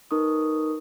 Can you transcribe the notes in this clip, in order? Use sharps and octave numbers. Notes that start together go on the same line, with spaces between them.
D#4 A#4 B4 C#6 D#6